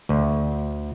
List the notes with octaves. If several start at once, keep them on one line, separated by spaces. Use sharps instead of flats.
D2